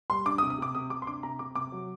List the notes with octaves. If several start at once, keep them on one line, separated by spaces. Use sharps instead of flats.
G3 C6
D4 D6
D#6
C3
D#6
C3 D6
C3 D#6
C3 D6
C6
D4 D6
C3 A#5
C3 D6
C3 D6
F#3